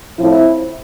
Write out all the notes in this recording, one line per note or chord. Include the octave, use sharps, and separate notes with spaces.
A2 F3 C4 E4